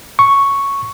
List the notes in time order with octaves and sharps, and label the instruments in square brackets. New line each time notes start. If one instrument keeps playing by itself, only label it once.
[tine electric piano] C#6